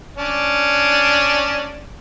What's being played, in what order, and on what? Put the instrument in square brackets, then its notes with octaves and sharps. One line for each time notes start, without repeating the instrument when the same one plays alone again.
[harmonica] C#4 D4